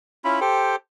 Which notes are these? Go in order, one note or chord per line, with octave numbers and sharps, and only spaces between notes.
C#4 E4 F4 B5
G4 A4 C5 G5